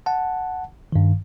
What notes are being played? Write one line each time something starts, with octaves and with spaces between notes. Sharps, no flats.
F#5 A5
G2 D#3